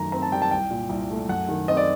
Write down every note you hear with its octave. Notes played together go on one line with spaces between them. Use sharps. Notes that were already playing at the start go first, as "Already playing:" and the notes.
Already playing: F#2 D#3 A3 A#5
C4 A#5
A5
G3 G5
A5
C2 G5
A#2
C2
A3
F#2 F#5
D#3
C4 D#5
D5